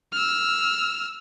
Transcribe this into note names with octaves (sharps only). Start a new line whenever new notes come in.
E6 F6